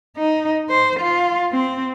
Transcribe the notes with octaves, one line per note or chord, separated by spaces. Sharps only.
D#4
C5
F4
C4